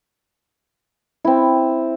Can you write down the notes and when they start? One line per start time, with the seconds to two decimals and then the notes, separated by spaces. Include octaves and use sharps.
1.24 C4 E4